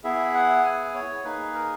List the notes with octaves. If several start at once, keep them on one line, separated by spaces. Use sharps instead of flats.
B3 E4 G#4 E5
F#5
G#5
C#5
A#3 D#4 G#4 B4
A#4